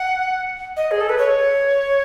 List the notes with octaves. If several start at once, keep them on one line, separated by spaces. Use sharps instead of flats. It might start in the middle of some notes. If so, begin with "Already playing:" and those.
Already playing: F#5
D#5
G#4
A4
B4
C#5